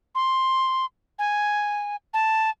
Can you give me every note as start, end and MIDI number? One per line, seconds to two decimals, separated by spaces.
0.15 0.85 84
1.19 1.96 80
2.14 2.50 81